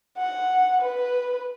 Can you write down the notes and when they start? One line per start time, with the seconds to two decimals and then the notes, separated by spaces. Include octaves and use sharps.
0.18 F#5
0.81 B4